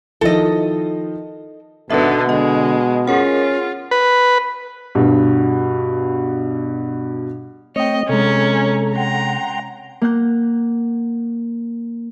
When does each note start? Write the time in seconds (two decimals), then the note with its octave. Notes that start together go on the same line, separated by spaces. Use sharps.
0.21 D#3 F3 E4 A4 D#5
1.90 G#1 B2 D3 B3 B4 E5
2.29 D3 G#3 D#5
3.07 C#4 F4 G#4 A#4 F#5
3.91 B4
4.95 G2 B2
7.76 A3 C4 C#5 D#5 G5
8.09 C3 G#3 C#4 A4 A#5
8.95 F#5 G5 A#5 C6
10.01 A#3 F#5 G6